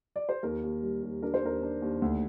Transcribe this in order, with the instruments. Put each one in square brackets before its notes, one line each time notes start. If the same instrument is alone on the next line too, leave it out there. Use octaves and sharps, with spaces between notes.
[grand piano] D5
C5
D#2 A#4
D#2
G3
D#2
D4 A#4
C5
D#2 A#4
D4
D#2
D2